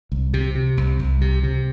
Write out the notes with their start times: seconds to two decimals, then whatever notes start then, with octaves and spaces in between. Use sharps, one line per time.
0.12 C2
0.34 C3
0.55 C3
0.77 C2
0.99 C2
1.21 C3
1.43 C3